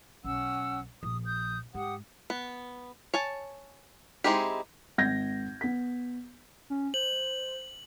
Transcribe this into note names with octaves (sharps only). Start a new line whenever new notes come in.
B1 C#4 F#5 E6
A#1 D#6
D#6 G6
G#2 G4 F#5 D#6
B3
C#5 G#5 A5
G#3 C4 D#4 E4 G4
G#1 G6 G#6 A#6
B3 B6
C#4
C5 F#7